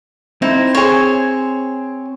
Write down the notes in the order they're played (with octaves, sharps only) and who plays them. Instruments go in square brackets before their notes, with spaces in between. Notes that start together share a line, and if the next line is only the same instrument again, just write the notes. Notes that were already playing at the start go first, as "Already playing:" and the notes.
[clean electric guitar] C4 [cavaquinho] D#4 E4 C5
[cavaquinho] G#4 C5 C#5